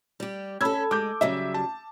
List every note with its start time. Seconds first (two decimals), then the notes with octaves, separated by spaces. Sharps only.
0.20 G3 G4
0.61 C#4 A4 B5 E6 G#6
0.91 G#3 D6 G6
1.21 C#3 F#3 G3 E5
1.54 A5